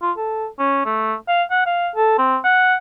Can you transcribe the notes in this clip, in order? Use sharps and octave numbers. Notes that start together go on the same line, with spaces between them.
F4
A4
C#4
A3
F5
F#5
F5
A4
C4
F#5